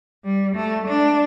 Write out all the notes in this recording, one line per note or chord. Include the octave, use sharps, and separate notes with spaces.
G3
A3
D4